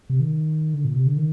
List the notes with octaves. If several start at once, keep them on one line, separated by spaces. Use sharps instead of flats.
C3
D#3
D3
A#2
C3
D3
D#3